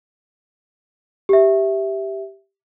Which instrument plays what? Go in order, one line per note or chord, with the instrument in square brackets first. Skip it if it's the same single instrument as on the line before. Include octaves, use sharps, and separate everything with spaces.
[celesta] G4 E5